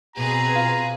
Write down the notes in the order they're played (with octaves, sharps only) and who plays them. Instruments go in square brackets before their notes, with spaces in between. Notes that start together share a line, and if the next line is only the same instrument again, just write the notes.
[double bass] B2 C4 [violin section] G#4 B4 [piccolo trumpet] A#5
[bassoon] F4